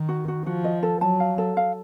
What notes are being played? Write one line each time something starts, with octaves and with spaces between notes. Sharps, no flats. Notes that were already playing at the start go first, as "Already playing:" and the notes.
Already playing: D#3
F#4
F#4
F3 F#4
D#5
A4
F#3 A5
F5
A4
F5